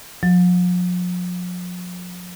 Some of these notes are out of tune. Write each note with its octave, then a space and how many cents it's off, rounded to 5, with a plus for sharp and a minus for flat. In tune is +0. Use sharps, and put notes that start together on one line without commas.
F3 +40